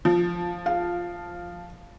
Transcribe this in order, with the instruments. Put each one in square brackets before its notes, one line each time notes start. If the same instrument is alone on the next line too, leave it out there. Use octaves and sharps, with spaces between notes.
[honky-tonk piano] F3
[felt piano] F5